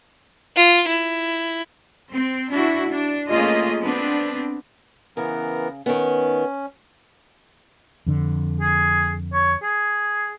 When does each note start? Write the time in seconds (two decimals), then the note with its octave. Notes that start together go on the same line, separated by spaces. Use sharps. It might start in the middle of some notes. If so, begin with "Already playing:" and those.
0.56 F4
0.88 E4
2.11 C4
2.52 D4 E4 F#4
2.92 D4
3.28 A3 A#3 C#4 F4 G#4 D#5
3.80 B3 C4 D4
5.17 C#3 E3 B3 A#4
5.86 D#3 B3 C#4
8.06 F2 D3
8.61 G#4
9.34 C#5
9.63 G#4